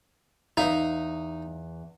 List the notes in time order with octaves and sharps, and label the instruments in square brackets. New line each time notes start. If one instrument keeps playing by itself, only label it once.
[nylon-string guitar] E2 E5 F5 [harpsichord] D#4